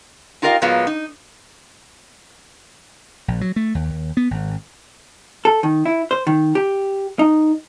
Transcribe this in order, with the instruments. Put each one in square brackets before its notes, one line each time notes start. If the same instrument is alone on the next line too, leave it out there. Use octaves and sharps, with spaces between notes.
[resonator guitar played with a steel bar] D#4 F4 G4 A#4 D#5 F5
A#2 F#3 G#3 A#3 B3 F4
D#4
[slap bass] A#1
F#3
A3
D#2
D#2
B3
G#1
[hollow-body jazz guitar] A4
D#3
E4
C5
D#3
G4
D#4